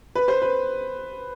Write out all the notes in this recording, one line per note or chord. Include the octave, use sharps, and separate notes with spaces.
B4
C5
B4